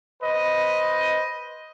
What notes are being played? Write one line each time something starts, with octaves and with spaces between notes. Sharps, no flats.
B4 C5 D#5